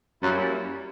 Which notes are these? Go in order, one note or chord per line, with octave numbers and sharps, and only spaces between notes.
F#2 G3 A#3 C#4 E4